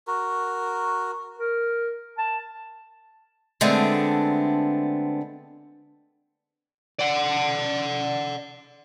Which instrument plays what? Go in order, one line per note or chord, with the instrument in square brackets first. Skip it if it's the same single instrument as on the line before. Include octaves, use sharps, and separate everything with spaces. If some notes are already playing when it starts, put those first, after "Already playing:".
[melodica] F#4 A#4
[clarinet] A#4
A5
[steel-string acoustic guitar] D3 G#3 A3 B3 C4 D4
[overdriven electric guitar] D5 F#5